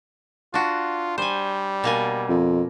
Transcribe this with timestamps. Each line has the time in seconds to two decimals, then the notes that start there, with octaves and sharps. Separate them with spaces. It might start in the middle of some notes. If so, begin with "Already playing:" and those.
0.54 D4 F4 F#4
1.18 G3 C5 G#5
1.84 B2 A#3 G#5
2.29 F2